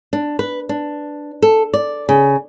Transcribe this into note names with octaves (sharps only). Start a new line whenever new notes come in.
D4
B4
D4
A4
D5
C#3